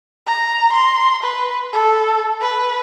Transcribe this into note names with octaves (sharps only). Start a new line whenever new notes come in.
A#5
C6
B4
A4
B4